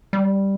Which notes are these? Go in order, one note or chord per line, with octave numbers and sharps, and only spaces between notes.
G3